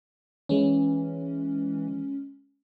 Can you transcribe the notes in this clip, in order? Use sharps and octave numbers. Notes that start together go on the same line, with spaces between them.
E3 G#3 C#4